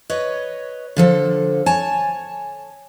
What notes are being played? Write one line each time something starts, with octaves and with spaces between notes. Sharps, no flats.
B4 C#5 D#5
D3 F3 A4
C#5 G#5 A5